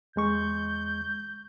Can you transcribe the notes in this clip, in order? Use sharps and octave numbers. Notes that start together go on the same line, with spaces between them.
E2 G#3 C#6 G6